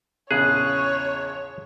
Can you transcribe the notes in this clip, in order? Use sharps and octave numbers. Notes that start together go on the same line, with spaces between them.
A#1 E2 C#3 G#4 C#5 F#6